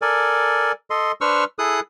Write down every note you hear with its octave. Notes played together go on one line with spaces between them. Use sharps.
A4 A#4 D5 G#5
A4 D#5 C6
D4 B4 C5 C#6 E6 F6
E4 G#4 A4 D#6 F#6